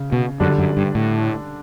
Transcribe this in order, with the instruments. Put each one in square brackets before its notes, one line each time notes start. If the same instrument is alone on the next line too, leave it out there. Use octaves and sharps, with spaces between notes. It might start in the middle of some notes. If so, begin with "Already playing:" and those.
Already playing: [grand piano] C#3
[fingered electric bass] B2
[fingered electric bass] F#2 [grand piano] D3 G3 D4
[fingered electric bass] F#2
G2
A2